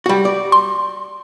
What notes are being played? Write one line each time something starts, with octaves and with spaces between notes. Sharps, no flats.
G3 F#4
D5
C6